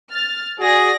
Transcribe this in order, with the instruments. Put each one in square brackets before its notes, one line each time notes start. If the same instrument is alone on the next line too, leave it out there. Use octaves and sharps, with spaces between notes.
[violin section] F6 A6
[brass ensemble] F#4 G#4 [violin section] D5 A#6